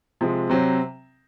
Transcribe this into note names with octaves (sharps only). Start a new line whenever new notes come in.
C3 F3 G#3
C3 F#3 C4